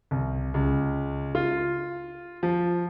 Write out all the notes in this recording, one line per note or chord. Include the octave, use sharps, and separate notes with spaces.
C2
C#2
F4
F3